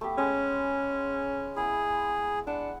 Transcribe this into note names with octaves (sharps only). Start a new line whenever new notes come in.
A3 B3 G4
G#3 C#4
B3 E4 G#4
D4 F#5